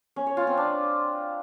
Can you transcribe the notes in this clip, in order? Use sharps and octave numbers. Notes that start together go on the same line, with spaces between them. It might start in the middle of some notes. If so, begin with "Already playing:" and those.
C#4
C#5
F4
C4
D4